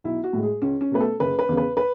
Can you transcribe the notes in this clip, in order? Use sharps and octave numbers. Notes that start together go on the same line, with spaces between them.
B1 E4
F#4
A2 G#3
G#4
C#2 C#4
C#4
B2 A3 B4
A4
F#1 B4
B4
E2 C#3
B4
B4